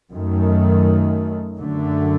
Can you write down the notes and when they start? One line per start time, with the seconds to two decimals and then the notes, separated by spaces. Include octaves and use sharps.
0.11 F#2 D#3 A3
1.57 F#2 D3 A3